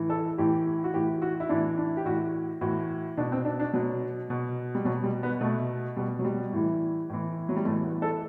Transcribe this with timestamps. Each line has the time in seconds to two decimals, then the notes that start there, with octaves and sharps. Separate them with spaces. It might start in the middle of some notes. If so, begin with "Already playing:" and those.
Already playing: A2 E3
0.10 A4
0.38 A2 E3 G4
0.84 F#4
0.94 A2 E3 G4
1.22 F#4
1.40 E4
1.49 A2 E3 D4
1.77 D4
1.97 G4
2.05 A2 E3 F#4
2.61 A2 E3 F#4
3.17 B2 D4
3.32 C4
3.45 D4
3.60 D4
3.73 B2 F#3
4.30 B2
4.75 G3
4.85 B2 F#3
5.03 G3
5.23 B3
5.41 B2 A3
5.97 B2 G3
6.19 F#3
6.25 G3
6.52 A2 E3
7.09 A2 E3
7.49 F#3
7.56 G3
7.65 A2 E3 A3
7.84 B3
8.02 A4